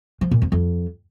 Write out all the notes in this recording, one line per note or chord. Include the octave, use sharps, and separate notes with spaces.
F3
A#2
F2
F2